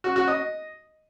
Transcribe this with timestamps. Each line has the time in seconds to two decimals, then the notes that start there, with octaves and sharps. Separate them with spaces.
0.04 F#4
0.16 F#4
0.28 D#5